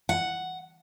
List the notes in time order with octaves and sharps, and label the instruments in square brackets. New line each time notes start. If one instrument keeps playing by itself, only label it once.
[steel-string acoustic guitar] F#5